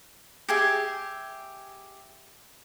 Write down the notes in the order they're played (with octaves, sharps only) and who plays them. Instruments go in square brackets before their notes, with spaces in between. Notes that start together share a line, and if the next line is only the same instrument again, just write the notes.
[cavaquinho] G4 G#4 E5